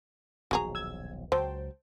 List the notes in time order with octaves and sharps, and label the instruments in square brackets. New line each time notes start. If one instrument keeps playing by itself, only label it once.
[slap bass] D#1 B1 F3 [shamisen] F#4 G#4 A#5
[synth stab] E6 G#6
[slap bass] C#2 [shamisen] F#3 [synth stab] C5 G5 A5